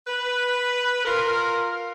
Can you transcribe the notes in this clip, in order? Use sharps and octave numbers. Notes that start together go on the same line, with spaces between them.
B4
F4 A#4